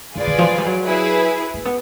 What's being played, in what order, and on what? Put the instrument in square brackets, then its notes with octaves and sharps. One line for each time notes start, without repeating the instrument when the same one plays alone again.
[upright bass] D3 [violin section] F4 G#4 B4 D5
[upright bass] D3
F3
F#3
G3
F#3
[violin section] E4 G#4 B4
[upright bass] A#3
B3